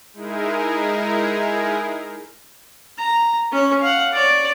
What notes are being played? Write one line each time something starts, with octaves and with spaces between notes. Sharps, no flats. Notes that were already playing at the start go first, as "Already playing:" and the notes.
G#3 D#4 E4 G#4 A#4
A#5
C#4 C#5
F5 F#5
C#5 D5